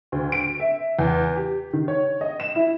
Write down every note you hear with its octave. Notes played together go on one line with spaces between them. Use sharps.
D2
D7
E5
E2
G4
D#3
C#5
D#5
E7
E4